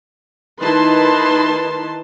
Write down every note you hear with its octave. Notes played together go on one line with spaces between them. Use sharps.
D#3 D#4 E4 B4 A5 C6